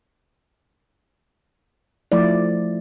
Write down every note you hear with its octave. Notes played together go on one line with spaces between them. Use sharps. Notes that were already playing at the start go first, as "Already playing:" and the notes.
F3 A3 E4 D5